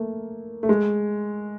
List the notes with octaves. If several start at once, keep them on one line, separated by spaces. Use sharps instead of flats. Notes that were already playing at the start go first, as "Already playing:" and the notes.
Already playing: A3 A#3
A3
G#3